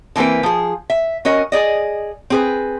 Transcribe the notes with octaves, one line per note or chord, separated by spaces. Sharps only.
D3 E3 A#3 C4 B4
F3 G#4
E5
C#4 F#4 A#4 D#5
G#4 D5 D#5
C4 G#4 B4